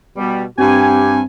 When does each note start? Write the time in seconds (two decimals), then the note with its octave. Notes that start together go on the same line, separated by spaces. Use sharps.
0.17 B2 G3
0.58 G2 C4 G4 G#5